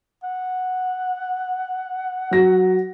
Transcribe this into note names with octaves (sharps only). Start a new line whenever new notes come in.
F#5
F#3 A#6